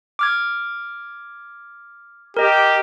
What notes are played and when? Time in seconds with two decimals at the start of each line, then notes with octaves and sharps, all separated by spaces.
0.19 D6 F6 G#6
2.37 G4 A#4 D#5